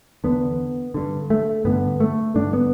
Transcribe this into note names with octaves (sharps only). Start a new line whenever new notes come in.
E2 D3 B3
G2 D3
A3
G2 D3 B3
A3
G2 D3 D4
B3